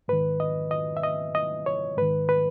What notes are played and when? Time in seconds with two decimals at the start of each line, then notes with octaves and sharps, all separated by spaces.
0.08 G#2 D#3 B4
0.40 D#5
0.71 D#5
0.97 E5
1.03 D#5
1.35 D#5
1.66 C#5
1.97 G#2 D#3 B4
2.29 B4